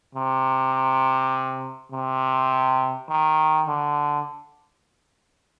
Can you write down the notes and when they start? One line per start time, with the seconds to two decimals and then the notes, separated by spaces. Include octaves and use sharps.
0.15 C3
1.91 C3
3.09 D#3
3.67 D3